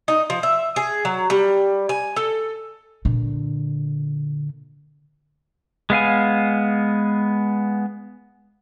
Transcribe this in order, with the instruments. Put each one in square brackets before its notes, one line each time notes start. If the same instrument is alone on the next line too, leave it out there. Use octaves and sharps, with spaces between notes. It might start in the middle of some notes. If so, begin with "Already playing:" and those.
[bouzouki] D#4
F3
E5
G#4
F#3
G3
G#5
A4
[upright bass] A#2 D3
[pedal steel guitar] G#3 B3 F5 G#5